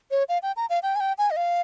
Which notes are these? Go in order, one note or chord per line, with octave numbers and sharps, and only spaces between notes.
C#5
F5
G5
A#5
F5
G5
G#5
G5
G#5
D#5
F5